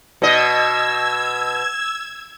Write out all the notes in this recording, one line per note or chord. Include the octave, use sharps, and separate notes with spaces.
B2 D#5 E6 G#6